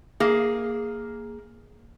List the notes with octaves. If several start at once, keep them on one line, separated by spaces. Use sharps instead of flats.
A#3 G#4